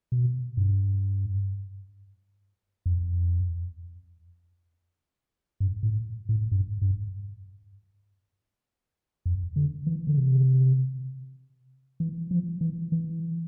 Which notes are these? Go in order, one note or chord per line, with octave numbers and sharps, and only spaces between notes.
B2
G2
F2
G2
A2
A2
G2
G2
F2
D3
E3
D3
C3
E3
F3
E3
E3